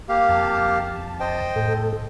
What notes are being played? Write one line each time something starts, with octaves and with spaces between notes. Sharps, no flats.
A#3 G4 F5
F2 A5
C5 D#5 G5
A2 A4